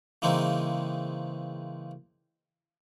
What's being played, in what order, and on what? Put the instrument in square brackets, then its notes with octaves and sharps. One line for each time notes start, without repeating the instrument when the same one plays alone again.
[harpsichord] C#3 E3 G#3 A#3 C4 D#4